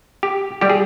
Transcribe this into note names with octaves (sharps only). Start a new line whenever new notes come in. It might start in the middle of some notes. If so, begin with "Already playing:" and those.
G4
G3 G4
G#4